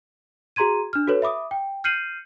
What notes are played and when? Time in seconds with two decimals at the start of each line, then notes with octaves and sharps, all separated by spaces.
0.56 F#4 G#4 A#5 C6 G#6 D#7
0.93 D4 F6
1.08 F#4 A4 B4 C#5
1.22 E5 B5 D6 D#6
1.51 G5
1.84 F6 G6 C7 C#7 D#7 F#7